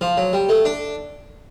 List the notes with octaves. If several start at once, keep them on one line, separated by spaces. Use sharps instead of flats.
F3
F#3
G3
A3
D4